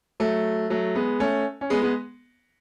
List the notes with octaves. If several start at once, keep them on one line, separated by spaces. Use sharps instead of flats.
F#3 A3
F#3 A3
G#3 B3
A3 C#4
C#4
G#3 B3
G#3 B3